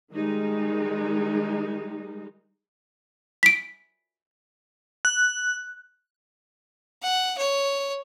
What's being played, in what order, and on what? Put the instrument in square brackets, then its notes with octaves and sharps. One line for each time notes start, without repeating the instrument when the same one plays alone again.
[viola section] D#3 G3 G#3 D#4
[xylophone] B6 D7
[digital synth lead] F#6
[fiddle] F#5
C#5